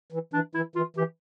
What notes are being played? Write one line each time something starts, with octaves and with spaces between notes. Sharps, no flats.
E3
E3 D4
E3 E4
E3 F4
E3 G4